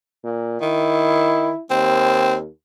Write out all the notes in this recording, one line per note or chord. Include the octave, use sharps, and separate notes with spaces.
A#2
D#3 E4
D#2 C4